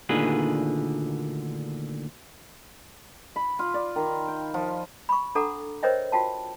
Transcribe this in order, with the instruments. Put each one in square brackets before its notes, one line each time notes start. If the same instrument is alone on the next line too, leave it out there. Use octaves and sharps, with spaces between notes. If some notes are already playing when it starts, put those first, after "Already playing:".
[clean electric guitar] D2 A#2 D3 D#3 G#4 B4
[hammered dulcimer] B5
F4
D5
D#3
G5
F3
[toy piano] B5 C#6
D4 A4 F#5 A#5 D6
A#4 C5 C#5 D#5 E5 G5
F4 F#4 G5 A5